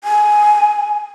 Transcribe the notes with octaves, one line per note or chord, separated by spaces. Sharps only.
G#5